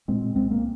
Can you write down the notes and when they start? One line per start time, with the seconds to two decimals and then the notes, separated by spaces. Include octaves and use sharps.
0.08 A#2 G#3 C4
0.35 C2 G#3 C4
0.51 A#3